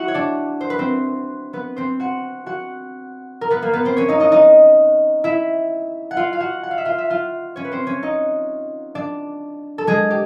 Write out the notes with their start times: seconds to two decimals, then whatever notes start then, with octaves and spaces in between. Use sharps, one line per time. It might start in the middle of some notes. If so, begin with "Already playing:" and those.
Already playing: E4 F#4 E5 F#5
0.08 C#5
0.14 D4 D5
0.61 C5
0.70 B4
0.79 C4 C5
1.53 B3 B4
1.76 C4 C5
2.00 F#4 F#5
2.46 F#4 F#5
3.41 A#4
3.50 B3 B4
3.62 A#3 A#4
3.73 B3 B4
3.85 C4 C5
3.97 C#4 C#5
4.08 D#4 D#5
4.20 D#4 D#5
4.32 D#4 D#5
5.24 E4 E5
6.11 F#5
6.17 F4 F5
6.33 F5
6.40 F#4 F#5
6.63 F#5
6.71 F5
6.78 E5
6.85 F4 F5
6.98 E5
7.10 F4 F5
7.56 C#4 C#5
7.65 B4
7.72 C4 C5
7.87 C#4 C#5
8.03 D#4 D#5
8.95 D4 D5
9.78 A4
9.87 G#3 G#4
10.11 G4